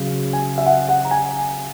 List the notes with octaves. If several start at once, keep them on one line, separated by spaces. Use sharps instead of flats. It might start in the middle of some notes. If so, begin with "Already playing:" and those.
Already playing: C#3 F#3
G#5
E5
F#5
F#5
A#5
G#5